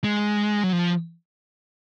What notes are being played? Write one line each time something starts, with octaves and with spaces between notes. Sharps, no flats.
G#3
F#3
F3